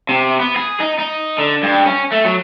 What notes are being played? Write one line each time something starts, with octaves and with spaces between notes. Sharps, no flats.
C3
B3
G#4
D#4
D#4
D3
G2
C#4
A3
F#3